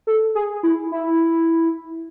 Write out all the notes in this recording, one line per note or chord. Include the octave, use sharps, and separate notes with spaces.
A4
G#4
E4
E4